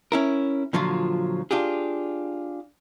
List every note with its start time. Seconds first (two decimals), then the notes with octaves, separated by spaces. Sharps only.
0.12 C#4 E4 A#4
0.73 A#2 D3 F3 F#3 F4
1.51 D4 F4 G4 G#4